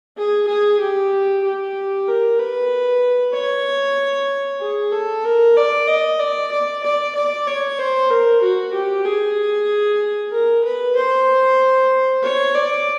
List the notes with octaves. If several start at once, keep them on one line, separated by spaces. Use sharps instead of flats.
G#4
G#4
G4
G4
A#4
B4
C#5
G#4
A4
A#4
D5
D#5
D5
D5
D5
D5
C#5
C5
A#4
F#4
G4
G#4
A#4
B4
C5
C#5
D5